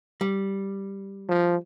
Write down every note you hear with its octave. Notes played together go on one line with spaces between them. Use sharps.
G3
F3